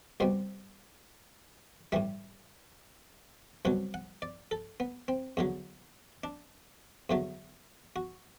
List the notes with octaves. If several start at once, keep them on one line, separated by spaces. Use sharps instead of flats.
C2 B2 G3 C5
A2 E3 G3 E5
C2 B2 F#3 F#5
F#5
D5
A4
B3
C4
E2 D3 F#3
D4
E2 D3 F#3 A3
F#4